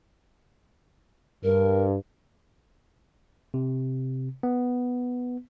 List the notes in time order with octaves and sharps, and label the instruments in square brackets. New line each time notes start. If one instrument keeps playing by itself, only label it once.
[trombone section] G2 [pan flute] A#4
[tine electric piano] C3
B3